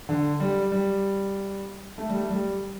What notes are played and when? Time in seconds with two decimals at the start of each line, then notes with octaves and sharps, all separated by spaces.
0.09 D3
0.40 G3
0.72 G3
1.98 A3
2.09 G3
2.20 A3
2.30 G3